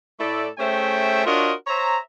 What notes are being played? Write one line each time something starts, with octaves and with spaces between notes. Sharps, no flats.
A2 A3 E4 A4 D5
A3 C#4 G#4 C5 E5 G5
D4 F4 F#4 A#4 C#5 D#5
C5 C#5 E5 A#5